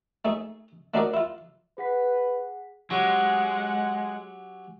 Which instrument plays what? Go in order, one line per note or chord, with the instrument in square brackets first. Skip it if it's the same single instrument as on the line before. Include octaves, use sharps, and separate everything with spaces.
[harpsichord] A3 D#4 G#4
A3 D4 D#4 F#4 A#4 D5
E4 F4
[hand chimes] G#4 F#5 B6 [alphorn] B4
[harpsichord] F#3 C#4 G4 [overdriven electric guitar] G#3 [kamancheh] F#5